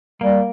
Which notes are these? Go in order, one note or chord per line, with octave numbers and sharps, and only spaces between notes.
G3 A#3